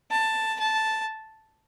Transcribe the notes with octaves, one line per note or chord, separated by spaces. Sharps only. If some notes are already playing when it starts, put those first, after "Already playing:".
A5
A5